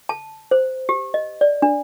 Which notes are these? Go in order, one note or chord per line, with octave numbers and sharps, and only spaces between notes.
A5
C5
G4
D#5
D5
D4